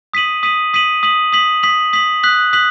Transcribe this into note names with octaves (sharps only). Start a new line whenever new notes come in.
D#6 B6 D#7 F#7
D#6 B6 D#7 F#7
D#6 B6 D#7 F#7
D#6 B6 F#7
D#6 B6 F#7
D#6 B6 F#7
D#6 B6 F#7
D#6 F#6 B6 F#7
D#6 F#6 B6 F#7